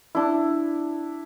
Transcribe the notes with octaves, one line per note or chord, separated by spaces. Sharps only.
D4 E4